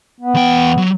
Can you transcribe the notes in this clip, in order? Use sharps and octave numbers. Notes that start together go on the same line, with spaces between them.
B3
E2 G5
F#3